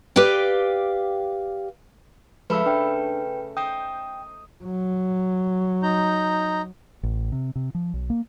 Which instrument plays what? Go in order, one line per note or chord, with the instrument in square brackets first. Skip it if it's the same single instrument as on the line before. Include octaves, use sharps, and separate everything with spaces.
[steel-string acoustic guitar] G4 B4 D5 F5 G5
[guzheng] C#3 A3 [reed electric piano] F3 G#3 [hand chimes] B4 B5 E6
[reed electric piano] D4 [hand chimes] B4 G5
[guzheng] D#4 C5 [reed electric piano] G5 [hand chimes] D#6
[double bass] F#3
[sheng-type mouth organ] D#4 A#5 G6
[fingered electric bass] A1
C3
C3
F3
B1
A#3